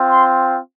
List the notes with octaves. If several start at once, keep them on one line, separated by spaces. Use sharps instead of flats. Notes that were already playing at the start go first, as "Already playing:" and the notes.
Already playing: C4 F4
C6